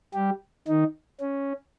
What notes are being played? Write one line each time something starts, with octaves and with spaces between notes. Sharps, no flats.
G3 G4
D#3 D#4
C#4